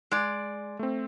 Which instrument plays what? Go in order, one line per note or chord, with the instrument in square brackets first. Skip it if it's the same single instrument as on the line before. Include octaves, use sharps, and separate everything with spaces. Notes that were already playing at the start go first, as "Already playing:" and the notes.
[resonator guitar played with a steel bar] G#3 D5
[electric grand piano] A3 C4